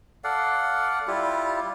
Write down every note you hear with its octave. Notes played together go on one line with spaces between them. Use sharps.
A4 D5 F5 F#5
G3 E4 F4 G4